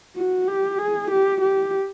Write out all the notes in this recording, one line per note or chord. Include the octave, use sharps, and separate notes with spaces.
F#4
G4
G#4
G4
G4